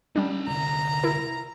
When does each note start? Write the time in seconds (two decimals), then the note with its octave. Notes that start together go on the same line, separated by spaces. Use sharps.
0.16 G3 C#4 D4 G5
0.48 C2 D3 A#5
1.03 E4 A#4